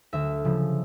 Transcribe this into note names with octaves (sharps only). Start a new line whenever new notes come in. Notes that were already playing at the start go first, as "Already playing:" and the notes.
D2 E5
C#3 F3